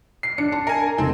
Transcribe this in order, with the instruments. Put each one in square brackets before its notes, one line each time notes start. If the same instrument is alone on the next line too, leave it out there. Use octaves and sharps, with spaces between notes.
[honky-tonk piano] C7
[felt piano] D4 [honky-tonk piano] C#7
[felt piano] A5
[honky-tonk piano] A#4 G#5
[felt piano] F1 [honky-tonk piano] C4